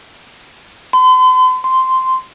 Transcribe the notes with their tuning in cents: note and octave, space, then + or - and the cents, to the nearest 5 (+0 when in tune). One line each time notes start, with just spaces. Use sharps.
C6 -45
C6 -10